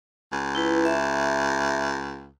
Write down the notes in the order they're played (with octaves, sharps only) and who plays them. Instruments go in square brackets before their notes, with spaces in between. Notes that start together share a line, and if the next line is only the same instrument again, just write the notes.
[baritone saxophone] C#2
[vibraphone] E4 B4
E5